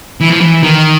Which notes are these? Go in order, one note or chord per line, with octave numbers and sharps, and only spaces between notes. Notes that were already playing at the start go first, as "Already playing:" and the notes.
E3
F3
E3
D#3